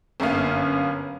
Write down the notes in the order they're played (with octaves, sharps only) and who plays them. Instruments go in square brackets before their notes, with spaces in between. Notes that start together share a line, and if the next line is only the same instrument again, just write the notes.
[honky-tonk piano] G1 F#2 A#3 B3 F5